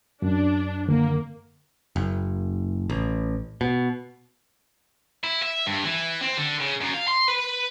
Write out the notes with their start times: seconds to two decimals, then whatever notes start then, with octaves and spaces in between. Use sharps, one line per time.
0.22 F#2 D4
0.88 D3 D#3 A#3 C4
1.96 F#1
2.90 A1
3.61 B2
5.24 E4
5.43 E5
5.67 G2
5.84 E3
6.21 C4
6.37 D3
6.60 C#3
6.81 F#2
6.94 F5
7.08 C6
7.28 B4